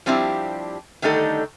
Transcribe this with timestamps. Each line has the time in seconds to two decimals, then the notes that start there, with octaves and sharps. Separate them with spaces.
0.06 F3 G3 C4 D4 E4 G4
1.02 D3 D#3 G3 A3 D#4 A4